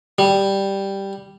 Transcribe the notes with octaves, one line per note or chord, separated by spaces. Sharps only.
G3